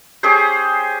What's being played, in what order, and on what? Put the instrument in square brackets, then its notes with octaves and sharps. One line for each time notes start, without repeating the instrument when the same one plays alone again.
[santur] C#4 G4 G#4 C5